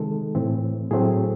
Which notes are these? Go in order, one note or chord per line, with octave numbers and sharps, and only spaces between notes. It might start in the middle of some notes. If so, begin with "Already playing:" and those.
Already playing: C3 D#3 G#3 A4
A2 E3 C4
A2 F#3 A3 C4 G#4